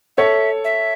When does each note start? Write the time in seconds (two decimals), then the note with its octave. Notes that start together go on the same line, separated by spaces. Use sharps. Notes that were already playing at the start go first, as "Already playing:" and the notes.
0.17 A4 C#5 E5
0.64 E5